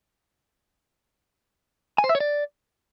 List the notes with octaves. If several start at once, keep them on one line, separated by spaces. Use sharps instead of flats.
G#5
C5
E5
C#5
D5